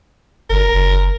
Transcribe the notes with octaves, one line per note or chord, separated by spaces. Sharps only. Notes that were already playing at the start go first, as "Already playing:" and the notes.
G1 A#4
F#1